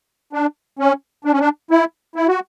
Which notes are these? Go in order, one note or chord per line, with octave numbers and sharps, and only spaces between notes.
D4
C#4
D4
C#4
D4
E4
E4
F#4